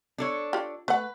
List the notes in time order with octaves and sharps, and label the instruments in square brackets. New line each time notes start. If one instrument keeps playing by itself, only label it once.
[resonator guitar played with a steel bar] D4 A4 C#5
[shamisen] F4 G4
[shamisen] A3 F#5 [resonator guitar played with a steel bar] B4